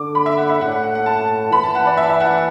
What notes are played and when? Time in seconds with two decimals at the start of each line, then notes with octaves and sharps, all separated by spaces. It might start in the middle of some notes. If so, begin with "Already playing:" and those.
Already playing: D3 D6
0.15 B5
0.26 E5
0.37 F#5
0.49 E5
0.61 A2 F#5
0.71 F#5
0.83 F#5
0.95 F#5
1.06 A5
1.52 E3 B5
1.63 A5
1.75 F#5
1.87 D5
1.97 E5
2.09 E5
2.20 F#5